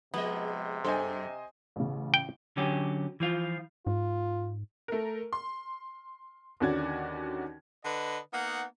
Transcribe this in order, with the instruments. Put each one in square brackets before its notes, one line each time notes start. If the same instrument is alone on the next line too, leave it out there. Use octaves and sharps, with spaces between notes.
[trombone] C3 [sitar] F3 G#3 D#5 [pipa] B3
[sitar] F#2 A4 [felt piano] C5 D#5 G#5
[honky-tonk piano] A1 C#3
[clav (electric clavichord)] G5
[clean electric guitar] D3 F#3 C#4 G4
E3 F3 F4
[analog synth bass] G#2 [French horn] F4
[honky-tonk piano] A3 A#4
C6
D#2 D3 C#4 F#4 D5 G#6
[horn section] D3 B4 D#5
A#3 B3 D#4 F#5